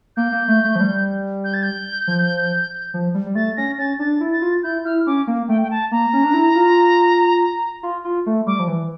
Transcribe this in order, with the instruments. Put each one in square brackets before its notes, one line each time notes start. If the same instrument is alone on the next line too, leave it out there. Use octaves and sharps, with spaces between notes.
[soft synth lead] A#3 [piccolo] G6
[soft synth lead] A#3
A3
A3
F3
G3
[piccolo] G6
A6
G6
[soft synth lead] F3
F3
G3
G3
[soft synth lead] A3 [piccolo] A6
[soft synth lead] C#4 [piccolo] A#6
[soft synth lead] C#4 [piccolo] A6
[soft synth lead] D4 [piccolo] A6
[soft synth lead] E4
[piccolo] A6
[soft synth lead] F4
[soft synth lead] E4 [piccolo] G6
[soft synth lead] E4 [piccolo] F6
[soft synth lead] C#4 [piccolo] D6
[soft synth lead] A#3
[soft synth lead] A3 [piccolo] G5
[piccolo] G5
A5
[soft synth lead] A#3 [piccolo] A#5
[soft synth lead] C#4
D4
E4
F4
F4
F4
A3
[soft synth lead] G3 [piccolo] D6
[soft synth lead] F3
E3